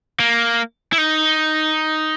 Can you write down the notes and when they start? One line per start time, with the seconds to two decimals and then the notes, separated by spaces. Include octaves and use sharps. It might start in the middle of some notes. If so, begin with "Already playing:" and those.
0.20 A#3
0.93 E4
0.98 D#4